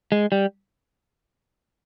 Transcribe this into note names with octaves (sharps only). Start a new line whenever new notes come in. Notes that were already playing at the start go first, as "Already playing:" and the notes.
G#3
G3